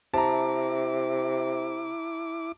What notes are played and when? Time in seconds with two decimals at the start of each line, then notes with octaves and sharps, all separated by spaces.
0.14 C3 E4 A5 A#5 D6